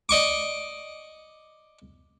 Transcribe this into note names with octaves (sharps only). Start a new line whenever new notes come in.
D5 D#5 C#6 D6